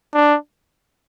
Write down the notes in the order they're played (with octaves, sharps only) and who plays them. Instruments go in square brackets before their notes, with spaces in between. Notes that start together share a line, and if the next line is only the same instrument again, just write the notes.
[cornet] D4